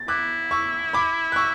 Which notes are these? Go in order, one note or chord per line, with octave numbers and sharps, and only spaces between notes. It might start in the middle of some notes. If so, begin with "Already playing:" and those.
Already playing: A6
E4 D6 F#6
C#6 E6
B5 D6
F#6
C#6 E6